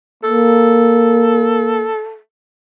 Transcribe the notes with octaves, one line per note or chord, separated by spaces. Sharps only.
A#3 A4